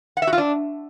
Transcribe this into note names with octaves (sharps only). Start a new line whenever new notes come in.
F#5
E5
F#4
F4
D4